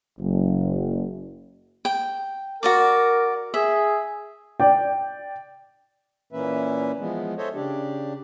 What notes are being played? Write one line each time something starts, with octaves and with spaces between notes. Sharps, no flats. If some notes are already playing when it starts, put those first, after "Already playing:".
F#1
G5
F#4 A#4 D5 D6
G#4 E5
D5 G5
A#2 E3 A#3 C#4 B4 E5
E3 F3 G#3 B3
A4 C5 C#5 D#5 E5
C#3 D4 G4